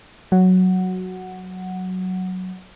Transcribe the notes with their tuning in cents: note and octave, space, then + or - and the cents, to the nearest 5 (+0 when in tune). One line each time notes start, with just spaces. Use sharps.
F#3 +0 F#5 +0